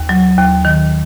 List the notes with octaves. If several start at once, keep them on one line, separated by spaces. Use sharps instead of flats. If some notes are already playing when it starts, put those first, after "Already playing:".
Already playing: D#2
F#3
D#2
D#3